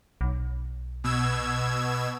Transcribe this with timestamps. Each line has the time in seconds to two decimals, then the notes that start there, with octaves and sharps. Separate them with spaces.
0.21 B1
1.04 B2 E6 G#6